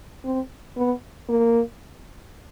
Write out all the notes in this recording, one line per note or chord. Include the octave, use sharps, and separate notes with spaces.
C4
B3
A#3